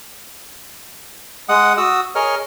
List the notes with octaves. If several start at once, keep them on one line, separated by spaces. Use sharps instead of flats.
G#3 F#5 D#6
F#4 D#6 E6
G#4 A#4 C#5 D#5 F6